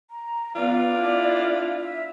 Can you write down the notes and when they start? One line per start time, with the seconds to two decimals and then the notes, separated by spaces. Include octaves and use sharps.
0.10 A#5
0.56 B3 F4 D5
0.94 D4 E4
1.78 E5